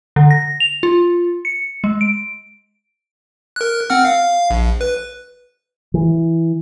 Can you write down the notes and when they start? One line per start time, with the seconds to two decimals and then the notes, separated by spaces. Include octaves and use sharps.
0.16 D3
0.31 A#6
0.60 F7
0.83 F4
1.45 C#7
1.84 G#3
2.01 D7
3.56 A#4 F#6
3.90 C4 F#5 F6
4.05 F5
4.50 A#1
4.81 B4
5.94 E3